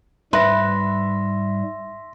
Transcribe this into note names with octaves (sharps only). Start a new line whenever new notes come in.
G#2 G3 B4 E5 C6 A#6